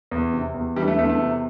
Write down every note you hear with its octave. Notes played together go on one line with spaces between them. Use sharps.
E2
C3
E2
E3 G3
A3
E2 A3
A3
C3